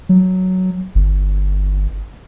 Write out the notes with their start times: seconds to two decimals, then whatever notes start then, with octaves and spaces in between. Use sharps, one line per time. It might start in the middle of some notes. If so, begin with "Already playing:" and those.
0.09 F#3
0.95 G1